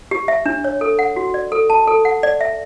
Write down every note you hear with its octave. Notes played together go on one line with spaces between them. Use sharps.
G4
E5
D4
C#5
A4
F#5
F#4
D5
A4
A5
A4
F#5
D5
E5